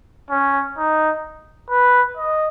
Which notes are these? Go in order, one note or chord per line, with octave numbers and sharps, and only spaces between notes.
C#4
D#4
B4
D#5